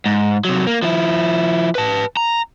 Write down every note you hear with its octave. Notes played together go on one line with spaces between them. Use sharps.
G#2
C3 F#3
A#3
F3 E4
B4 A5
A#5